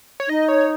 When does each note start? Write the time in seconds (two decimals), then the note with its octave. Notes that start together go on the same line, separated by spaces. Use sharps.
0.20 C#5
0.28 D#4 D#5
0.48 C#5